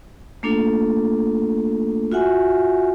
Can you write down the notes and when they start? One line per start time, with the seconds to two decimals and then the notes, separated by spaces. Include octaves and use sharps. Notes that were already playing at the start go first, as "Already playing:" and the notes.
0.43 A3 A#3 D4 F4 A4
2.12 F4 F#4 E5 F#5 G#5